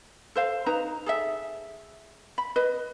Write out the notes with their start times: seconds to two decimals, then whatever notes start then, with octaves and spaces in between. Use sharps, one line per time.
0.36 A4 C5 F5
0.66 D#4 B4 A#5
1.06 G#4 A4 E5
2.38 B5
2.56 B4 D#5